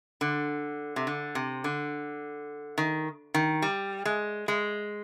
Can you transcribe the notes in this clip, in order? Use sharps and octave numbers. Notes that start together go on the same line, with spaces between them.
D3
C3
D3
C3
D3
D#3
D#3
G3
G#3
G#3